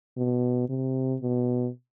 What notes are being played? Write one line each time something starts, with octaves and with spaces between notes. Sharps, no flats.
B2
C3
B2